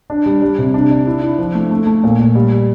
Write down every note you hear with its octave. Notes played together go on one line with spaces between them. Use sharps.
D4
G3
G3
C3
D4
D4
E4
E4
F3
A3
A3
A3
A#2
A#2
G3